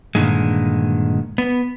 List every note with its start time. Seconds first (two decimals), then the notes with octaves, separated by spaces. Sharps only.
0.15 G2 A#2 D3 D#3 G#3
1.38 B3